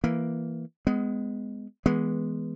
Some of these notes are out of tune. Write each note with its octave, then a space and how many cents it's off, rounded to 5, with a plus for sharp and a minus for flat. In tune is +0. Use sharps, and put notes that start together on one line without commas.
E3 +10 A#3 +0
G#3 +0 B3 +30
E3 -20 G#3 +0 B3 -5